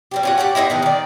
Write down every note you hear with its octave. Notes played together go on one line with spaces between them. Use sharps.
G3 C4 G4
C#4 F4 F#4
G4 A4 C#5 F#5
C4 C#4 D#4 E4
D#3 A3 B3
D#3 D5